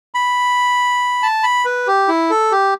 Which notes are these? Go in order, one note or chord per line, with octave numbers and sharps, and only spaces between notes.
B5
A5
B5
B4
G4
E4
A4
G4